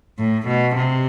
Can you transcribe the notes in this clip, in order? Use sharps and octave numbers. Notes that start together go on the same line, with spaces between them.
A2
B2
C3